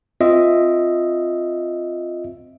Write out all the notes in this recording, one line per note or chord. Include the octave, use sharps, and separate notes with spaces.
C4 F4 D#5 E5